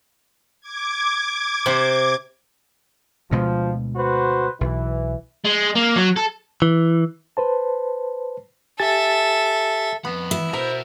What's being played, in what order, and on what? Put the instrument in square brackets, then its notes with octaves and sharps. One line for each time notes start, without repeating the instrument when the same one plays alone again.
[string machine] D6 G#6
[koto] C3 C5
[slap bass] D2 B2 G#3 [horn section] F3
[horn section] F#4 B4 C5
[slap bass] B1 [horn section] E3
[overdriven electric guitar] G#3
A#3
F#3
A4
[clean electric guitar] E3
[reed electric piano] B4 C5 A5
[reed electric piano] G4 G#5 A6 [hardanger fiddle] A4 E5
[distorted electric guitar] F2 B5 [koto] B3
[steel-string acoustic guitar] E4
[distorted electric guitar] B2 F#4 [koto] A#4 E5 [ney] C5